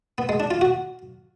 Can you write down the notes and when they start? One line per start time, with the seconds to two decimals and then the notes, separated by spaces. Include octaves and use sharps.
0.18 B3
0.29 G#3
0.40 D4
0.51 F4
0.61 F#4